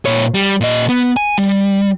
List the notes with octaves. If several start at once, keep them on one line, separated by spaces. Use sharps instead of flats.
A#2 C#5
G3
A#2 D#5
B3
G#5
G3